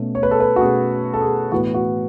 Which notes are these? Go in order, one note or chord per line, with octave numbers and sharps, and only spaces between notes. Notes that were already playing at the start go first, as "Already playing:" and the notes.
Already playing: B2 A3 C#4
C#5
B4
A4
B4
F#4
B2 A3 C#4 G#4
A4
G#4
A2 E3 B3 F#4
F#4